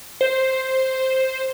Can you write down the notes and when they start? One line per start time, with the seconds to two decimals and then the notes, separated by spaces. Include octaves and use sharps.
0.21 C5